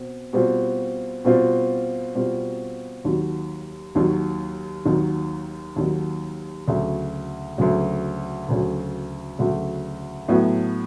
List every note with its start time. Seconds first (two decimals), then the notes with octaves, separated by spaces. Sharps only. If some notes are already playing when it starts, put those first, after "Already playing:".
Already playing: B2 C4
0.33 B2 G3 C4 F4
1.25 B2 G3 C4 F4
2.15 B2 G3 C4 F4
3.05 D#2 D#3 F#3
3.95 D#2 D#3 F#3
4.85 D#2 D#3 F#3
5.76 D#2 D#3 F#3
6.68 D2 C#3 F#3
7.58 D2 C#3 F#3
8.49 D2 C#3 F#3
9.39 D2 C#3 F#3
10.28 A2 F#3 B3